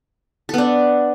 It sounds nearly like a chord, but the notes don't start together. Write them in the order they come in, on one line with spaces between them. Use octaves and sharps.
A4 B3 D4